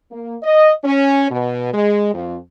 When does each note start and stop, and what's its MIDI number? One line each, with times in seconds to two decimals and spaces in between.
0.11 0.36 58
0.43 0.72 75
0.84 1.27 61
1.30 1.72 47
1.73 2.11 56
2.14 2.37 41